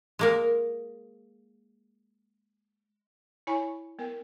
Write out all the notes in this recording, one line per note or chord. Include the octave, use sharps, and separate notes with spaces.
G#3 A#3 A#4
E4 C#5 G#5 B5 C#6
B3 A#4 G5